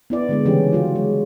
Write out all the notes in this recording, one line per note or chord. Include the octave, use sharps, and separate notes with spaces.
B3 E4 D5
D3 G#3 B3
C#3 E3 G3 C#4 E4 G4
F#3 F4
G#3